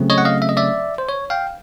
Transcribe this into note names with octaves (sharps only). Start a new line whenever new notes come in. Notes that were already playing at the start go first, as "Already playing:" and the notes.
Already playing: C#3 F#3 A3 C4
C#5 D#5
F#5
D#5 F5
E5
D#5
D5 E5
C5
C#5
F5 G5